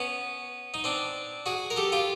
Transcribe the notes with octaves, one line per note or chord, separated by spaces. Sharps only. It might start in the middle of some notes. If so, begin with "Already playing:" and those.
Already playing: B3 C#4
D#4
C4 D4
F#4 G#4
A#4
G4 A4
F4 G4